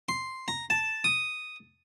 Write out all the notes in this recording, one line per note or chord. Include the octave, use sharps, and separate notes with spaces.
C6
A#5
A5
D#6